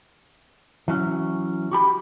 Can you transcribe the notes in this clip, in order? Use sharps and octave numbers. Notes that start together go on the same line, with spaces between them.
E3 F#3 C#4
F#4 G4 B5